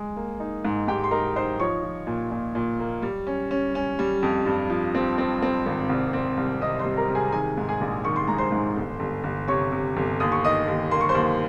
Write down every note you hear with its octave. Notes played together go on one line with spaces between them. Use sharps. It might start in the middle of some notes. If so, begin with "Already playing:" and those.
Already playing: G#3
A#3
D#4
G#2
G#2 G4 G5
C6
D#4 A#4 A#5
D#4 C5 C6
F3 C#5 C#6
F3
A#2
A#2
A#2
A#3
G3
C#4
C#4
C#4
G3
F2
G2
F3
C4
C4
C4
G#1
C2
C4
C2
C3 D#5 D#6
C5 C6
G3
A#4 A#5
C3
G#4 G#5
A#5
D#3 G#4 G#5
G#2
G#4 G#5
A#1
D#3 C#6
C6
G#3 A#5
C5 C6
G#2
G1
G1
G1
C3 C#5 C#6
C3
G1
D#2 D#6
C#6
D#3 D#5 D#6
D#2
A#3 C6
C#6
C5 C6
D#2